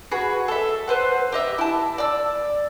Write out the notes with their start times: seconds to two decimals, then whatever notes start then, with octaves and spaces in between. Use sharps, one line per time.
0.11 F#4 G#4 B4
0.48 A4 E5
0.88 B4 C5 F#5
1.32 G4 D#5 E5
1.58 E4 A5
1.98 D5 E6